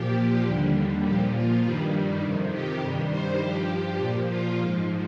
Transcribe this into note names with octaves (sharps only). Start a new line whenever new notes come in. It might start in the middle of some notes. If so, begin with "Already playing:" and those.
Already playing: A#2 F3 G4
D#2 D3 G3
A#2 F3 G4
F4
G2 D#3 G3
F2 C3 D#3
G4
G2 D#3 G3
C5
G2 F3 G4
A#2 F3 G4
F4
G#2 F3